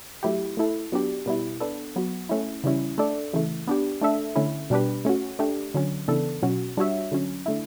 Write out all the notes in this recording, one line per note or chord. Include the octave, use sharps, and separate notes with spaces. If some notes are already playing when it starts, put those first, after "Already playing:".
F#3 A3 E4 G4
A3 E4 A4
F#3 B3 D4 G4
B2 G3 B3 E4
B3 D4 A4
F#3 B3 F#4
A3 C#4 E4
C#3 E3 G3 C#4 E4
A3 D4 A4 D5
C#3 E3 A3
B3 D4 G4
A3 D4 A4 E5
D3 A3 C#4 E4
B2 G3 D4 G4 B4
A3 C#4 F#4
A3 D4 G4
D3 F#3 C#4
C#3 E3 B3 D4 A4
B2 F#3 C#4 F#4
G3 D4 F#4 C#5 E5
D3 F#3 C#4
D3 A3 E4